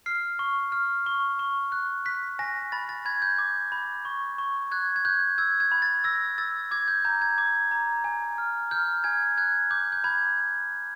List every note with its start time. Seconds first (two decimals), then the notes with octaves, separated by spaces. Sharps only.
0.06 F6 C7
0.39 C#6
0.72 F6
1.06 C#6
1.39 C#6
1.72 F#6
2.05 F#6 B6
2.39 G#5 A#6
2.72 B5 A6
2.89 A6
3.05 B5 G#6
3.22 G6
3.38 D6
3.72 B5
4.05 C#6
4.38 C#6
4.71 F#6 G#6
4.96 G#6
5.05 F#6 G6
5.38 E6 G#6
5.60 G#6
5.72 B5
5.82 A6
6.04 E6 A#6
6.38 E6 A6
6.71 D6 G#6
6.88 G6
7.05 A#5 G6
7.22 G#6
7.38 D6 G#6
7.71 A#5
8.04 G#5
8.38 F6
8.71 F6 G6
9.04 G#5 G#6
9.38 F#6 G#6
9.71 D6 G6
9.92 G6
10.04 B5 G#6